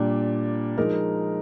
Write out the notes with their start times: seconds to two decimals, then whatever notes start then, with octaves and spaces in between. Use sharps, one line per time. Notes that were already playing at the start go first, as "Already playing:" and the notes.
Already playing: A#2 G3 D4
0.77 F3 G#3 D#4 A#4